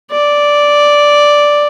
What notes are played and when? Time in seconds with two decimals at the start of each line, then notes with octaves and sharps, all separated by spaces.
0.11 D5